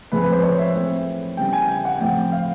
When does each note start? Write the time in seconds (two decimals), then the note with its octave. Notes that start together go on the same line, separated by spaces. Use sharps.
0.12 A2 F3 G#3 C4 B4
0.22 B4
0.32 C5
0.43 C#5
0.58 E5
0.74 E3 A3 C4
1.37 C#3 E3 G3 B3 G5
1.53 G#5
1.69 G5
1.85 F#5
2.01 A2 F3 A3 C4 G5
2.32 F5